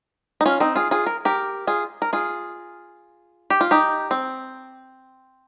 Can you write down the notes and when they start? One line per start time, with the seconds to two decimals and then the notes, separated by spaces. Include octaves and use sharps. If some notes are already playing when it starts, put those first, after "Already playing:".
0.41 D#4
0.46 C#4 F4
0.60 C4 D#4
0.76 F4 G#4
0.91 F4 G#4
1.06 A#4
1.25 G4 A#4
1.67 F4 G#4
2.02 A#4
2.13 F4 G#4
3.50 G4
3.61 F4
3.71 D#4 G4
4.11 C4